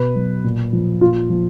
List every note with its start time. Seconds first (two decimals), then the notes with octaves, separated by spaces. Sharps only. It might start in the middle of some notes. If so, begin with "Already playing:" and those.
Already playing: B2 B4
0.16 F#3
0.44 A#2
0.73 F3
1.01 A#2 F4
1.30 F3